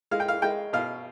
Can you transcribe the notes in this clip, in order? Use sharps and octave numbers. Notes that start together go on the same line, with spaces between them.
G#3 F5
G5
F5
G#3 G5
B2 F5